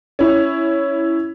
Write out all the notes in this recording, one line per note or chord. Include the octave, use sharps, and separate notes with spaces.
C#4 E4